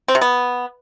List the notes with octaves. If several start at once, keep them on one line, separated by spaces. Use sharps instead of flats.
C4
C3
B3